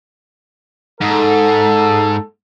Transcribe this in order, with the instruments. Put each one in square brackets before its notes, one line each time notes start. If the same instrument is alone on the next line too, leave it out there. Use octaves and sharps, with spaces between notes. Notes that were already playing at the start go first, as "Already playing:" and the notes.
[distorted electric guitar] G#2 [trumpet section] A4